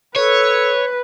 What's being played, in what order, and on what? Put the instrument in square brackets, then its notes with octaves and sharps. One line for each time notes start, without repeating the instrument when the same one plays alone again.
[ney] A4 [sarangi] B4 [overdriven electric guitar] C#5